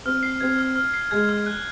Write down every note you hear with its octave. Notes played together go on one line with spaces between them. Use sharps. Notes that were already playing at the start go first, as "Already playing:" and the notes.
C4 F6
C7
C4 G#6
F6
F6
C7
G#3 G#6
F6
F#6